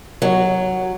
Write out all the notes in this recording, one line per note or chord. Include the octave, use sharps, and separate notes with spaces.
F#3